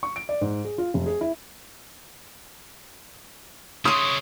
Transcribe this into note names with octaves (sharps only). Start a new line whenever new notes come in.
C#6
D7
D5
G#2
G#4
F4
F1
G#4
E4
C#3 E4 C#5 C6 D#6